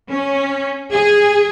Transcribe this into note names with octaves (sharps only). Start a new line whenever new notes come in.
C#4
G#4